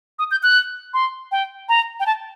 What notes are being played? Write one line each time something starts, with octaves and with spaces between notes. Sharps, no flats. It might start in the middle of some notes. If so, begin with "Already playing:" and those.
D#6
G6
F#6
C6
G5
A#5
G5
A5